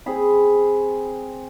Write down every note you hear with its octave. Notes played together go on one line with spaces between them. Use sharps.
C4 G#4 B5